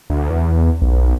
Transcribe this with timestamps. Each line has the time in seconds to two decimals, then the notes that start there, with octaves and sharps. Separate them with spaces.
0.10 D2
0.30 E2
0.82 B1